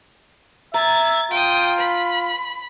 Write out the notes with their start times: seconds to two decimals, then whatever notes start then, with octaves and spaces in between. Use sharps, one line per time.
0.74 E5 A#5 G#6 A6
1.31 F4 G5 D#6
1.78 B5